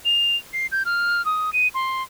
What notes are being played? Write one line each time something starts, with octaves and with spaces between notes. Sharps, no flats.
F7
C7
G6
F6
D#6
D#7
C6